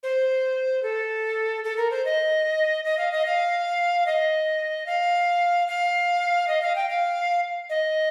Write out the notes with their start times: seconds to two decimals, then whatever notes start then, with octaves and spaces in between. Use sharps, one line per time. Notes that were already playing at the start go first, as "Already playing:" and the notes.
0.03 C5
0.83 A4
1.64 A4
1.77 A#4
1.91 C5
2.05 D#5
2.85 D#5
2.98 F5
3.12 D#5
3.26 F5
4.06 D#5
4.87 F5
5.68 F5
6.48 D#5
6.62 F5
6.76 G5
6.89 F5
7.70 D#5